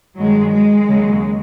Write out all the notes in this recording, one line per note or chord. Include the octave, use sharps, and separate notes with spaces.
G2 D#3 F#3 G#3
G#3
D#2 C#3 F#3